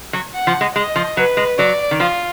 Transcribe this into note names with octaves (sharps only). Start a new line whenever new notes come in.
F#3
F#5
F3
G#3
G#3 D#5
F3
F#3 B4
G#3
F#3 D5
D#3
F3 F4